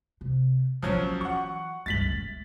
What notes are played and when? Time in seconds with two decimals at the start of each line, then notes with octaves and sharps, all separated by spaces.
0.21 C3
0.82 A#1 D3 F3 F#3 C#4
1.21 E3 F#5 C#6
1.86 C#2 G2 A6 B6 F#7
2.11 A3